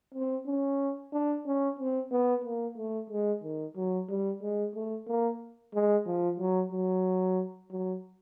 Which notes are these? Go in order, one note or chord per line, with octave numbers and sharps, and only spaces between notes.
C4
C#4
D4
C#4
C4
B3
A#3
A3
G#3
D#3
F#3
G3
G#3
A3
A#3
G#3
F3
F#3
F#3
F#3